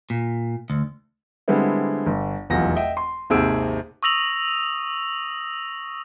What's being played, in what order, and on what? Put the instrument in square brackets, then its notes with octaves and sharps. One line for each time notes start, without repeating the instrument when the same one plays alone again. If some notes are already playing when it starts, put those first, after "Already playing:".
[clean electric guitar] A#2
D2
[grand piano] D3 G3 G#3 B3 C4 E4
G1
F1 B1 E2 F4 F#4 A#6
D#5 E5 G5
C6
G#1 D#2 C3 G#4 E6 D7
[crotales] C#6 D#6 E6 A#6 F7 F#7